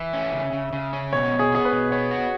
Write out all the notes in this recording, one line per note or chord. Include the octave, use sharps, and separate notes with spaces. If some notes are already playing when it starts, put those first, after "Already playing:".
Already playing: E3 E5
C#4
C#3
C#3
C#3
C#4
B2 C#5
B3
G#4
B3 G#4
B4
B2
B3 C#5
F#4